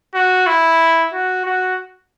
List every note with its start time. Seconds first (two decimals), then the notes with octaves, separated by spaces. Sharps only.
0.15 F#4
0.47 E4
1.13 F#4
1.45 F#4